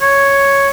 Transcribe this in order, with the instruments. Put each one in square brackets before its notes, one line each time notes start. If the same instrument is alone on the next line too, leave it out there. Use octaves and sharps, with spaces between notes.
[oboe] C#5